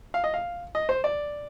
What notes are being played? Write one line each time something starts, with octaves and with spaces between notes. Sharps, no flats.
F5
D#5
F5
D#5
C5
D5